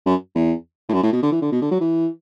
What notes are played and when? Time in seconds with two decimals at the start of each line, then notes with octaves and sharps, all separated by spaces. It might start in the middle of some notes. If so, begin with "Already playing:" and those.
0.06 F#2
0.35 E2
0.89 A2
0.93 F#2
1.03 A2
1.13 B2
1.23 D3
1.32 E3
1.42 D3
1.52 B2
1.62 D3
1.71 F#3
1.81 E3